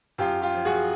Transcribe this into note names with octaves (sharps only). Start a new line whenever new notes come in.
F#2 F4 G4
F4 G4
F3
F#4 G#4